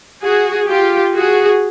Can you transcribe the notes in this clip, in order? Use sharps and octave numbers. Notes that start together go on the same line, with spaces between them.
F#4 G#4
F4 G4
F#4 G#4